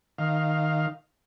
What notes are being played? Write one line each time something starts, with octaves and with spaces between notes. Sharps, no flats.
D#3 F5